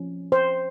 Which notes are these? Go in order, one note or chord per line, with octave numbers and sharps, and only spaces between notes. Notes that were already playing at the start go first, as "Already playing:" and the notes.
Already playing: F3 C#4
C5